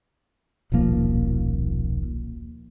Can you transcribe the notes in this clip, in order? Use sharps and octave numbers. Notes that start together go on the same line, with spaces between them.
D#1 B1 F3 A#3